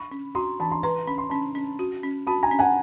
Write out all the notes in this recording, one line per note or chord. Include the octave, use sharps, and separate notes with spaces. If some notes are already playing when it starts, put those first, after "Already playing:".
Already playing: B5 C#6
C#4
F#4 A#5 C6
E3 A5 B5
A#5 C6
B4 A#5 C6
C#4 B5
C6
C#4 A5 B5
C#4
F#4
C#4
F#4 A5 B5
G#5 A#5
C#4
F#5 G#5